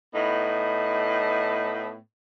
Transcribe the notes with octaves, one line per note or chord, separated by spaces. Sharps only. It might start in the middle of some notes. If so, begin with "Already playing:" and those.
A2 B3 D#4